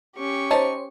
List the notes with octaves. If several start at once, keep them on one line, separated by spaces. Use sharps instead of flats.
C#4 G4 C#6
D#4 C5 C#5 A5